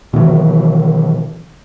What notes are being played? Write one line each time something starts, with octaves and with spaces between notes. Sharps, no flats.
B2 D#3 E3 F#3